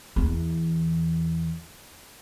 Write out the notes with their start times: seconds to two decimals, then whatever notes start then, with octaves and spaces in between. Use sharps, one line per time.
0.16 E2 E3